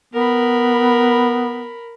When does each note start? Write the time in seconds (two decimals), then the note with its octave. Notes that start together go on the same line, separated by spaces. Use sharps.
0.14 B3 A#4 B5